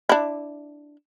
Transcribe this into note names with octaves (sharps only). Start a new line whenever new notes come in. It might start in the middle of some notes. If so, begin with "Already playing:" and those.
D4 E4